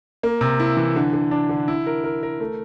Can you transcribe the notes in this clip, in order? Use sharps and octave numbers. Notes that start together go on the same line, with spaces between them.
A#3
C3
E4
E3
D3
D3
D4
D3
E4
A#4
A#4
A#4
A3